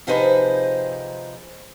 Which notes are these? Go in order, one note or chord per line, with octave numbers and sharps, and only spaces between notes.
C3 F3 D#4 G#4 B4 C5